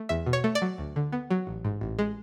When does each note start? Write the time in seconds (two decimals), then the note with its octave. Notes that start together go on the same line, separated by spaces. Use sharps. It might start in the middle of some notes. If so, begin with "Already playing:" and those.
Already playing: A3
0.09 E2 E5
0.26 B2
0.33 C#5
0.44 A3
0.55 D5
0.62 F#3
0.78 D2
0.96 D3
1.12 B3
1.30 F#3
1.47 A1
1.65 G#2
1.81 A1
1.99 G#3